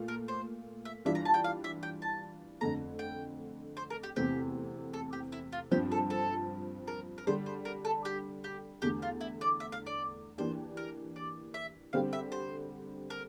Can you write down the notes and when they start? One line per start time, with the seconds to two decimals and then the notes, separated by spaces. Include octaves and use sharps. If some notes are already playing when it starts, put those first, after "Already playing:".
Already playing: A#2 A3 F4
0.08 A#4
0.28 C5
0.85 E5
1.05 E3 G3 D4 F4 E5
1.15 A#5
1.25 A5
1.34 G5
1.44 F5
1.64 E5
1.83 G5
2.02 A5
2.61 F2 D3 A3 A#5
2.99 G5
3.77 C5
3.90 A#4
4.03 G4
4.16 E2 C3 E3 A3 C4 G4
4.94 A4
5.13 G4
5.32 E4
5.52 F4
5.71 G2 F3 C4 G4
5.92 A4
6.10 A4
6.87 A#4
7.18 A#4
7.27 D3 G3 D4 C5
7.46 C5
7.65 A#4
7.85 A4
8.05 G4
8.44 G4
8.82 E2 D3 A3 G4
9.02 F4
9.21 E4
9.41 D5
9.60 E5
9.72 F5
9.86 D5
10.38 E3 A#3 D4 G4 C5
10.77 A#4
11.16 D5
11.54 E5
11.93 D3 G3 C4 G4 F5
12.13 E5
12.32 C5
13.10 A#4